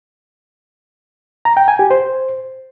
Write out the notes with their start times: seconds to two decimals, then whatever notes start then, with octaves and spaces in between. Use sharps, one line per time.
1.45 A#5
1.57 G5
1.68 G#5
1.79 G4
1.91 C5